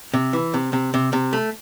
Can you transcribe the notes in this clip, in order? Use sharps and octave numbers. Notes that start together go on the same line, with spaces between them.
C3
E3
C3
C3
C3
C3
A3